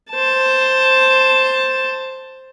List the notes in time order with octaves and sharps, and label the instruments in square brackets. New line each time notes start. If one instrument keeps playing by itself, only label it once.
[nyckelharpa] C5 A5